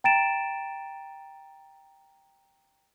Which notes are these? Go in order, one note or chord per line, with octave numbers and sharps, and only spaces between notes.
G5 A#5 A6 D7 E7